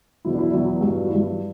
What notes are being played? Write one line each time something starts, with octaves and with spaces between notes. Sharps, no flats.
E2 B2 F#3 E4
D4
E4
E2 B2 F#3
G2 F#3
F#4
G2 F#3 E4